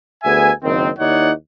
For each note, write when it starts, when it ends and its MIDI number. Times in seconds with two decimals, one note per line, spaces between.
0.24 0.52 38
0.24 0.52 59
0.24 0.52 68
0.24 0.52 76
0.24 0.52 80
0.63 0.89 30
0.63 0.89 51
0.63 0.89 58
0.63 0.89 60
0.99 1.31 39
0.99 1.31 63
0.99 1.31 64
0.99 1.31 73
0.99 1.31 74
0.99 1.31 78